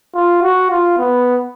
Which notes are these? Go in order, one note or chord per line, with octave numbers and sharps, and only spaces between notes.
F4
F#4
F4
B3